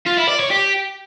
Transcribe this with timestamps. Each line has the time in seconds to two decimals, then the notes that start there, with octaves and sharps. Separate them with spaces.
0.07 F4
0.18 E4
0.29 D5
0.40 C#5
0.51 G4